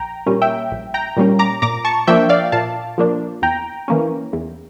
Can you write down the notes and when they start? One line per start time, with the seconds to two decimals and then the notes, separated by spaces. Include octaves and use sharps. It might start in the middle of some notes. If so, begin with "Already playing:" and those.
Already playing: A#1 G5 A#5
0.26 A#2 G3 A#3 C#4
0.42 E5 G5
0.72 A#1
0.94 G5 A#5
1.17 A#2 G3 A#3 C#4
1.39 A#5 D6
1.62 A#2 A#5 D6
1.85 A5 C#6
2.07 F3 A#3 D4 E5 G5
2.29 D5 F5
2.52 A#2 F5 A5
2.98 F3 A#3 D4
3.42 E2 G5 A#5
3.88 E3 A#3 C#4
4.33 E2